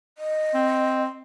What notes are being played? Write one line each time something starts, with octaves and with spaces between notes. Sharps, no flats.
D#5
C4